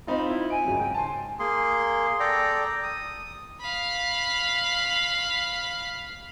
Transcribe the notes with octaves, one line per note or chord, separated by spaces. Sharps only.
C4 D#4 F4 B5
E4
G#5 D7
G#1 C#3 F#3
G#2 G5
G#5 A5 C6
A#3 G#4 C6
A4 D5 G5 A#5
D#6
F5 B5